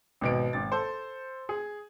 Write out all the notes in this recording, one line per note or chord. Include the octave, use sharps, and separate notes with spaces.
G#1 B2 D7
G#1 A6
A4 C5
G#4